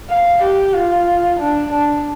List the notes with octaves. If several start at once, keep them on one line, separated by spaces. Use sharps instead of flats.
F5
G4
F4
D4
D4